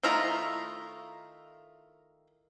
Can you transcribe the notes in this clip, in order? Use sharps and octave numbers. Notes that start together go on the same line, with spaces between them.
D#3 A3 E4 F4 A#5